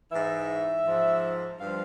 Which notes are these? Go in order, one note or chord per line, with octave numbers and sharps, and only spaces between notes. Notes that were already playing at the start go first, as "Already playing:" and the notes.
G#2 E3 E5
G#2 F3
G2 F3 F5